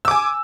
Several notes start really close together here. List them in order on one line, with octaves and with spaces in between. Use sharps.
E6 D6 G#5